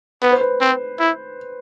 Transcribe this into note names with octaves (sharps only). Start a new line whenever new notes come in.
B3 B4
C5
B4
C4
E4